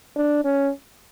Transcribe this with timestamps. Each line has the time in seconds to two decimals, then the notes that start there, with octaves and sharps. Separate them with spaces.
0.16 D4
0.45 C#4